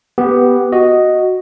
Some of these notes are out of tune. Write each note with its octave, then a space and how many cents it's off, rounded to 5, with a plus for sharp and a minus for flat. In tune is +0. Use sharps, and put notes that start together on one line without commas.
B3 +0 G4 +0
F#4 +0 D#5 +0